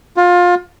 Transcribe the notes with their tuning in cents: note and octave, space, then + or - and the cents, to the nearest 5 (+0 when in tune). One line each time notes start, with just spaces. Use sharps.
F4 +25